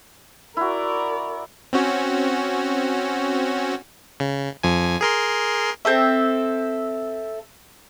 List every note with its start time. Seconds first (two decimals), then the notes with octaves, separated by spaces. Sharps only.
0.57 E4 F#4 A#4 D5
1.73 C4 C#4 F#4
4.20 C#3
4.63 F2 F3 G#5
5.01 G#4 A#4 C6
5.85 C4 A4 E5